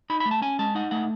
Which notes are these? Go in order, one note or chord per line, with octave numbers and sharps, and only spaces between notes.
D#4 B5
B5
A3
A5
C#4 G#5
G#3 A5
D#4 F#5
A3 F#5